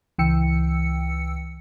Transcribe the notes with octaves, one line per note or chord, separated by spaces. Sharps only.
C#2 E3 G5 E6 C#7